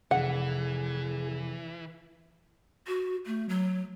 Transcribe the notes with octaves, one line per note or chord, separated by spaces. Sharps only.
F1 E3 G#4 F#5
F#4
A3
F#3